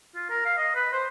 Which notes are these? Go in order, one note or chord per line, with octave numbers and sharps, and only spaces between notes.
F4
A#4
F5
D#5
B4
C5